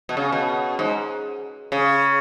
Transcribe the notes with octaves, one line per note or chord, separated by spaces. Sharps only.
B2
C#3
B2
G#2
C#3